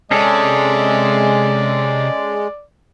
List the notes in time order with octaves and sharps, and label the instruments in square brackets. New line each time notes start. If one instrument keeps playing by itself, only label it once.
[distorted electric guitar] C3 [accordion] G#3 [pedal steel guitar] C#4 G#4 A4 [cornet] D5